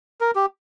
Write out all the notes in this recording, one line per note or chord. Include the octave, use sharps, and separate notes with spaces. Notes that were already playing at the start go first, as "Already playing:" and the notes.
A#4
G4